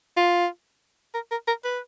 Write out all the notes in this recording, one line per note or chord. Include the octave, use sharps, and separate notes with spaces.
F4
A#4
A#4
A#4
B4